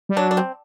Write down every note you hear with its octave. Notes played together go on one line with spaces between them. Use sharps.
G3
F#3 D4
D4
C4